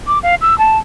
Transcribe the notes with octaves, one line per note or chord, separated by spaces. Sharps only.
D6
F5
E6
A5